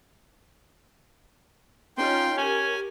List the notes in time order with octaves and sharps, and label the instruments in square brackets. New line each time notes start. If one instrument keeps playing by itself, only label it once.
[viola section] C#4 D#4 F4 [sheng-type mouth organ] G5 C6
[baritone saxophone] C#4 [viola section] G4 A#4 [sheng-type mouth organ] G#5